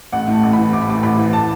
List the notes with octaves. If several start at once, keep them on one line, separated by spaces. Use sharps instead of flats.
A1 F#5
A2 A5
A1
B5
E3
A1 D6
B5
A2 D6
A1 B5
E3
A5